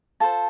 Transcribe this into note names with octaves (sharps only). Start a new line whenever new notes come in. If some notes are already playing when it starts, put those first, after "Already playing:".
F4 A4 C5 A5